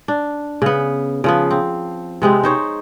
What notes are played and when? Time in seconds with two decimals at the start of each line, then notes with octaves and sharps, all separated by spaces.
0.08 D4
0.62 C#3 B3
1.24 C#3 F3 B3
1.51 C4
2.22 C3 G#3 B3 C4
2.43 D#4 C5 C#5